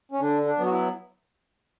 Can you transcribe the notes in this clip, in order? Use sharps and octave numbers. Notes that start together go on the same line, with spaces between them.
C#4
D3 D4
D4
F#3 B3
F#4
E4